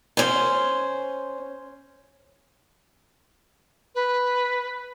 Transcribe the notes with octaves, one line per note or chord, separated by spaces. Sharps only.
C#4 C5
B4